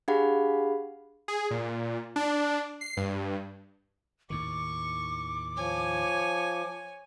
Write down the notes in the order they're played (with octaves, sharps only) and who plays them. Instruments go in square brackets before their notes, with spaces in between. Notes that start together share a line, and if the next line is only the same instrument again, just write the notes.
[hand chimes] D4 G4 G#4 F5 F#5 B5
[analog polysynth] G#4
A#2
D4
C7
G2
[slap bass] D#2 A2 D#3 [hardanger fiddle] C#6 [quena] D6
[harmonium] F3 [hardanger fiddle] C#5 G#5